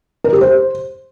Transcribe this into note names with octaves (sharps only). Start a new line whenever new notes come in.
A#4
G4
C5